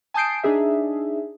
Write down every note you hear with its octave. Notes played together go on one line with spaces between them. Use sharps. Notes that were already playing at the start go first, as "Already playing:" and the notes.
G#5 A5 D#6 G6 C7 D7
D4 D#4 G#4 E5